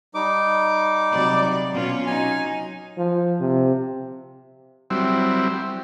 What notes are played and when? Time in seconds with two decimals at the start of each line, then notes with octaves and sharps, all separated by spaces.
0.15 G3 D#4 D6
1.12 C3 F#3 D5
1.71 B2 C#4 F4
2.06 F#3 D#4 G#5
2.98 F3
3.41 C3
4.90 F#3 G3 C4 E4